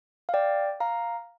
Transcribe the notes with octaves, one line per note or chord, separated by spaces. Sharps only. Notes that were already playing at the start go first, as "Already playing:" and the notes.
F5
D5 G5
F5 A#5